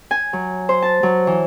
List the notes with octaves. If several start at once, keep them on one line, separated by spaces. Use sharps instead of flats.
G#5
F#3
C5
A5
F#3
E3